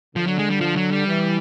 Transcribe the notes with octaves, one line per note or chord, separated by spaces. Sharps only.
D3 F3
F#3
G#3
G3
F3
F#3
G3
E3